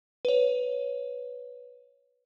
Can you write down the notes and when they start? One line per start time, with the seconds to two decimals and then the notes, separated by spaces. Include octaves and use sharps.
0.25 B4 C#5